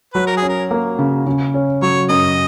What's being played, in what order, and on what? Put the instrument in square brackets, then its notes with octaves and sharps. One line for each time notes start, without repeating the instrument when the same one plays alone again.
[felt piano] F#3 [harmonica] B4
[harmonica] A#4
G#4
[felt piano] C#4
[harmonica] A#4
[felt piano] A#3
C#3
C#3
C#4
[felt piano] F#3 [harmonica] C#5
[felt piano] F#2 [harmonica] D#5